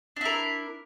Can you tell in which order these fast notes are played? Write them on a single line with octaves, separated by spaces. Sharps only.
D4 E4 A#4